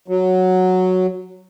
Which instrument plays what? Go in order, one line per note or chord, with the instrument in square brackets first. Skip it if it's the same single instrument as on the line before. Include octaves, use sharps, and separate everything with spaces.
[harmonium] F#3